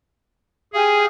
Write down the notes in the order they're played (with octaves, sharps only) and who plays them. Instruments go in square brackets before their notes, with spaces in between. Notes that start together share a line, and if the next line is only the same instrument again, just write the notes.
[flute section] G4 F5 G#5 [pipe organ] G#4